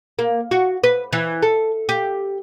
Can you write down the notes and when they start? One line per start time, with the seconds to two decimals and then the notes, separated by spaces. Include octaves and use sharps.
0.19 A#3
0.51 F#4
0.84 B4
1.13 E3
1.43 A4
1.89 G4